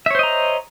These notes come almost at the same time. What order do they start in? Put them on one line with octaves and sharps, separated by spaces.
E5 C#5 C5 D#5 A#5